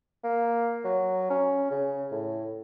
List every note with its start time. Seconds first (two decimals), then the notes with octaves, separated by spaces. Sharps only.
0.24 A#3
0.85 F#3
1.30 C#4
1.71 C#3
2.11 A2